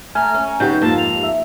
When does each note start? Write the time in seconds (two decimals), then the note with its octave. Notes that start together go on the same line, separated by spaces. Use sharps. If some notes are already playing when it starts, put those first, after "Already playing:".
0.15 A3 G#5 A#5 F6
0.34 C#4
0.60 C#3 F#3 B3 D#4 G4 G6
0.82 F2 G#2 A#3 A5
0.98 F7
1.23 E5